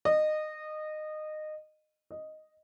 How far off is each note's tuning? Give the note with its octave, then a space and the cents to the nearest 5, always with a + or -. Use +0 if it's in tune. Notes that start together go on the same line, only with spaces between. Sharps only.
D#5 -20
D#5 +0